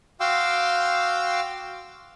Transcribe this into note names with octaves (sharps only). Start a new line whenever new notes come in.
F#4 F5 G5 C6 D6 E6